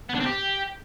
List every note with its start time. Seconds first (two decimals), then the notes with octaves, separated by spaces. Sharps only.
0.09 B3
0.15 D4
0.20 C4
0.26 G4